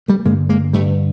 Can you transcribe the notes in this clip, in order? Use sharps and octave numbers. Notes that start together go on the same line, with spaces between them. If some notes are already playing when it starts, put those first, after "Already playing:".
G3 A3
G2 D3 G#3 A#3
G#3 A#3
G2 D3 G3 A3